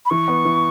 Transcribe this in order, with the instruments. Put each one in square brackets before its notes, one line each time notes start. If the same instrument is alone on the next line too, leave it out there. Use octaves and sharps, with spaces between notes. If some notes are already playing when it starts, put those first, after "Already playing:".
[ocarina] B5
[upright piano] E3 [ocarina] C#6
[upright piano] B3
E3